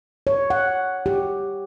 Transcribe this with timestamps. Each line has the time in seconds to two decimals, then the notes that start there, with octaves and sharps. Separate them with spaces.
0.27 C#5
0.50 F#5
1.06 G4